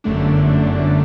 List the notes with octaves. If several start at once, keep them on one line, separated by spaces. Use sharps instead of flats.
G1 F#2 D3 A3 D4